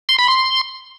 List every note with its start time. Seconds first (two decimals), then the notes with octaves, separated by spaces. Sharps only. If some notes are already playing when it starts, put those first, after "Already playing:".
0.09 C6
0.19 B5
0.28 C6